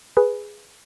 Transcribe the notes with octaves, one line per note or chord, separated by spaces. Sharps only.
G#4 B4